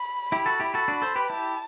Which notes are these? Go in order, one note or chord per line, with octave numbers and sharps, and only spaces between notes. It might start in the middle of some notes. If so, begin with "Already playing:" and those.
Already playing: B5
E4 G4
F#4 A4
E4 G4
F#4 A4 B5
D4 F#4
A4 C5
G4 B4
E4 G4 A5